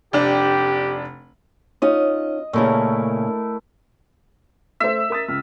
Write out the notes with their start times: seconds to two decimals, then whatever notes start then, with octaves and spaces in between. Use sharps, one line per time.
0.13 F1 D4 G4
1.82 C#4 D#4 F4 D#5
2.53 A#2 C#3 A3 E4 A#4
4.80 A3 C5 E5
5.10 A#4 D#6 A6
5.28 C#2 F6